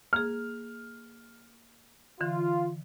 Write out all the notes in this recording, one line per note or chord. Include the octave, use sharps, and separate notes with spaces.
A#3 G#4 F6
D3 E3 F4